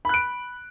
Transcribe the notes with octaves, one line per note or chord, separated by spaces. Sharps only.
B5 F#6 D7